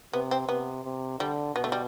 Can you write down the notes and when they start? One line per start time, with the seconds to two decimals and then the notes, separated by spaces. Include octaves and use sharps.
0.13 C3 B3
0.31 C4
0.48 C3 B3
0.84 C3
1.19 D3 G3
1.56 B2 B3
1.64 A3
1.72 G3